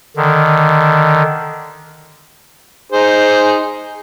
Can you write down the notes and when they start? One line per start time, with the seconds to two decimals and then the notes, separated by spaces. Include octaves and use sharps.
0.17 D3 D#3
2.92 D#4 G#4 C5